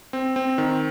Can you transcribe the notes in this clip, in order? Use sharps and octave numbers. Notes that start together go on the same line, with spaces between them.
C4
C4
D#3